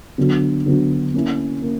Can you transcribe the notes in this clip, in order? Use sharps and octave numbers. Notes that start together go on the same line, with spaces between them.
D3 F#3 B3 D4 F#4
D3 F#3 B3 D4 F#4
A#3 C#4 E4
A#3